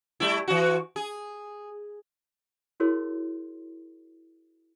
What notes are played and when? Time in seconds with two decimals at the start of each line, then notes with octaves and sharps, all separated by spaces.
0.20 G3 A3 E4
0.48 E3 F#4
0.96 G#4
2.80 E4 F#4 G#4 A#4 C#5 C6